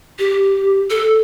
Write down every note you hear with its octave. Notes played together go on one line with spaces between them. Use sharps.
G4
A4